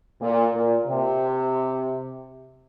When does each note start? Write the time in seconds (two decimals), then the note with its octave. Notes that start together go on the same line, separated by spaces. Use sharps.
0.21 A#2
0.54 A#2
0.86 C3